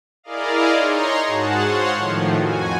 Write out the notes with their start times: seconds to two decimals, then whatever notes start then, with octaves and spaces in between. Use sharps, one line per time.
0.23 E4 G#4 A#4 D5 D#5 F5
0.74 D#4 C#5 A#5 C6
1.27 G#2 F#4 G#4 F#5 A5
1.65 C5 C#5 F5 F#5 C6
1.93 A2 D#3 F3
2.37 F2 F#4 G#5